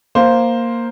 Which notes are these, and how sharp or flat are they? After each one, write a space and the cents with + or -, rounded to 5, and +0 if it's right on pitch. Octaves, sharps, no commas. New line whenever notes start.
A#3 +0 C5 +0